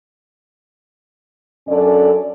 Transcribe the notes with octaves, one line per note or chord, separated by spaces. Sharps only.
F#2 C#4 D4 A4 D5